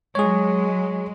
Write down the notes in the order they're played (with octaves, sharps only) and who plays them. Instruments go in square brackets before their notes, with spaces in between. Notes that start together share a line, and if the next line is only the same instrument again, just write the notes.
[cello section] F#3 G#3 [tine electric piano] G#4 C#5